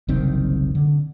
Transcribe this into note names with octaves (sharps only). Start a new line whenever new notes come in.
F#1 C2 D#3 C4
D3